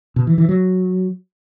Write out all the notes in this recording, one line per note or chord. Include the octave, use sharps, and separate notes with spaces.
B2
E3
E3
F#3